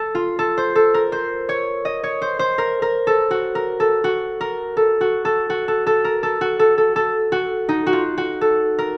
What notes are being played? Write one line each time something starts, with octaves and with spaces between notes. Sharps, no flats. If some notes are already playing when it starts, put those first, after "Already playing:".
Already playing: A4
F4
A4
C5
A4
A#4
C5
C#5
D#5
C#5
C5
C5
A#4
A#4
A4
F#4
A#4
A4
F#4
A#4
A4
F#4
A4
F#4
A4
A4
A#4
A4
F#4
A4
A4
A4
F#4
D#4
F#4
F4
F#4
A4
A#4